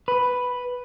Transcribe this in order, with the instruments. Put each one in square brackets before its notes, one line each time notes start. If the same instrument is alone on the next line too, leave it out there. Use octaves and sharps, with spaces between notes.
[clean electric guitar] B4